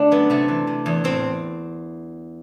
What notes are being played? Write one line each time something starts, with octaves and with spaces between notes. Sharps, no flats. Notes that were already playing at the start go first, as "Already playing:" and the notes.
Already playing: D3 A3 D4
F#2 B3
C3 A3
E3
C3
E2
A2 C4